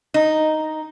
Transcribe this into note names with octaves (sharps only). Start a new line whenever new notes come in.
D#4